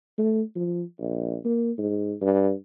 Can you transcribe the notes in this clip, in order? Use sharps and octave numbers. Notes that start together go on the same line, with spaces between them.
A3
F3
A#1
A#3
G#2
G2